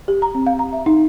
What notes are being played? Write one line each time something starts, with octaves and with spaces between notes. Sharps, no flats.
G4
A#5
C4
F5
A#5
E5
D#4